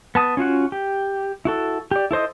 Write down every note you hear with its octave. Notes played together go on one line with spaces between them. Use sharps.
B3 A5 D#6
C#4 F4 F#4 F#5
G4
E4 F#4 A4
G4 D5
E4 A4 C5 D#5